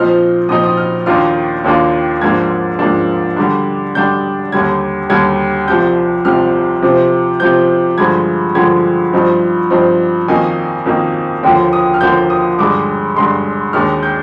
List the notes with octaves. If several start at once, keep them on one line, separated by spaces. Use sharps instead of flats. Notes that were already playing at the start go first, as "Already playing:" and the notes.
Already playing: A#2 F3 C4 D#4 F6
A#2 F3 C4 D#4 D#6
D#6
F6
D#2 D#3 A#3 D4 F4 F6
D#2 D#3 A#3 D4 F4
G#2 F3 A#3 D4 G#6
G#2 F3 A#3 D4
D3 G3 D4
D3 G3 D4 G6
D#2 D3 G3 G#6
D#2 D3 G3 G#6
C2 C3 F3 G6
C2 C3 F3 F6
C3 F3 C4
C3 F3 C4 G6
G2 D3 F3 G#3 G#6
G2 D3 F3 G#3 G#6
G2 F3 C4 D#4
G2 F3 C4 D#4
F2 D#3 A#3 D#4 G#5
F2 D#3 A#3 D#4
D#2 D3 F3 A#3 G5
D#6
F6
D#2 D3 F3 A#3 G6
D#6
G2 D3 G#3 D6
G2 D3 G#3 C6
D#2 D#3 G#3 D4 F6
G6